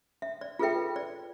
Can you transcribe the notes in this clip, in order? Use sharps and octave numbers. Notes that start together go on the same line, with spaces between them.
E5
D5
F4 G#4 A4 B4 E5 G5
D5